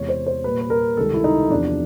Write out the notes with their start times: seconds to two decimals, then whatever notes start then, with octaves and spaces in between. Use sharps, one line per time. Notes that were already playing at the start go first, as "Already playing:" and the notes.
Already playing: E2 C3 E3 G#3 C#5
0.09 C5
0.27 C5
0.44 A#2 G3 A#3 B4
0.61 B4
0.70 A#4
0.97 C#2 C3 D#3 G3 A4
1.14 E4
1.24 D#4
1.50 E2 C3 F3 D4